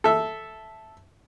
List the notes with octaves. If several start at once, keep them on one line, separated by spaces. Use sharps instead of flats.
A4 E5